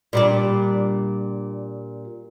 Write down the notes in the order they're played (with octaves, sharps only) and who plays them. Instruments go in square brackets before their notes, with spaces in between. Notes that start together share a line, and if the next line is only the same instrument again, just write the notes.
[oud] A#2 G3 D4